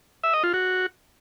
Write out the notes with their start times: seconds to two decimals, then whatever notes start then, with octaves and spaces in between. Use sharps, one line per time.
0.24 E5
0.34 D#5
0.44 F4
0.54 F#4